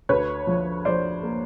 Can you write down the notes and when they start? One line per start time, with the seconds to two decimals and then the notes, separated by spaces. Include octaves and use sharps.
0.09 D2 B4 C#5
0.47 F3
0.85 F3 C5 D5
1.23 A#3